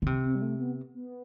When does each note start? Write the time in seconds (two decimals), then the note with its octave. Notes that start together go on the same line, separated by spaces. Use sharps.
0.02 D3
0.06 C3
0.24 C4
0.35 G3
0.42 A3
0.60 B3
0.95 B3